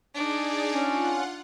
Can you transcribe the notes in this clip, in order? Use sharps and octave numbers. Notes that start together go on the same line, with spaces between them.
D4 D#4 G#4 D5
C#4 F4 F#5